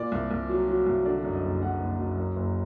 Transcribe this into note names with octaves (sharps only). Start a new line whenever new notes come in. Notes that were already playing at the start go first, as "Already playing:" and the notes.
Already playing: A#2 D5
C2
C2
F#3
F#3
C2
D3 D5
F#2
D#5
F#1
F#2 F#5
F#1
F#2
F#2
F#1